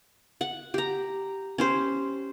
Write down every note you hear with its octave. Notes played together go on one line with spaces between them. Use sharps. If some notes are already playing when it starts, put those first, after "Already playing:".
F#5
G4 A#5
C#4 G4 C5